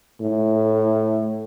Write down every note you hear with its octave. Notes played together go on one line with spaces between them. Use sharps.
A2